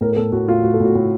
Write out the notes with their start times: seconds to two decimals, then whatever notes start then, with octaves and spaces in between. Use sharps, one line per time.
0.01 A2 A#4
0.13 A#4
0.17 A2 A4
0.32 A2 F#4
0.48 A2 F4
0.63 A2 F#4
0.74 A4
0.80 A2 F#4
0.95 A2